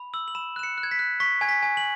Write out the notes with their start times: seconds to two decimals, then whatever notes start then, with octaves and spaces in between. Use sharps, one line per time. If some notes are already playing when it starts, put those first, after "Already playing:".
Already playing: B5
0.13 E6 F#7
0.28 F#7
0.35 B5 E7
0.56 F#6 E7
0.63 C#7
0.78 F#6
0.83 G#6
0.91 B6
0.99 F#6
1.20 C#6 B6
1.41 G#5 G#6
1.49 B6
1.63 G#5
1.77 F#7